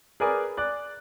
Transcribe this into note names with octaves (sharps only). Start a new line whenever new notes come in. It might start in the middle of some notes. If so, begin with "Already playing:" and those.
G#4 A#4 B4 D5 G#5 D#6
D5 F#6